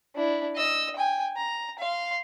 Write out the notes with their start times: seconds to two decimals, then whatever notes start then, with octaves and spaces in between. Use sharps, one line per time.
0.15 D4 E4
0.56 D#5 E6
0.96 G5 G#5
1.37 A#5
1.79 F5 C6